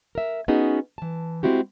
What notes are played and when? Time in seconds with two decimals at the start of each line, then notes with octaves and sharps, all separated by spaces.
0.15 A#4 E5
0.48 B3 C#4 D#4 F#4 G#4
0.98 E3 A5
1.43 G#3 C4 E4 F#4 G4